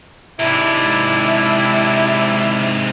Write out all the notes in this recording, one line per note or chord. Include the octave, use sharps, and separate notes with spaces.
G#2 C3 D4 E4